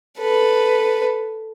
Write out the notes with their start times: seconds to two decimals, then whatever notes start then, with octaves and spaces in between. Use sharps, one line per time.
0.19 A4 B4